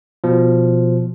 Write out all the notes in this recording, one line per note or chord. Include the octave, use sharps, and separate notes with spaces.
B2 F3